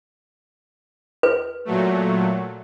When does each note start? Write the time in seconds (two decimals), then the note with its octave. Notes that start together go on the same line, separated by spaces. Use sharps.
1.23 B4
1.65 A#2 F#3 A3